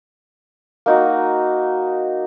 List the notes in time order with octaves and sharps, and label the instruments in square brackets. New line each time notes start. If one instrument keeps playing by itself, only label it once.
[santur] A#3 D#4 F#4